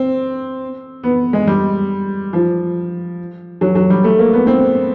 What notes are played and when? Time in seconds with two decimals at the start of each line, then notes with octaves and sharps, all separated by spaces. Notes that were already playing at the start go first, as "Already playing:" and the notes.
Already playing: C4
1.03 B3
1.33 G#3
1.47 G3
2.33 F3
3.61 F#3
3.75 F#3
3.90 G3
4.04 A3
4.19 A#3
4.33 B3
4.47 C4